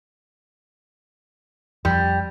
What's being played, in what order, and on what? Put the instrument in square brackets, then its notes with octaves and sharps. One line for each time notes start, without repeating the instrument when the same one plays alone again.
[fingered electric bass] F2 [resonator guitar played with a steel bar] G3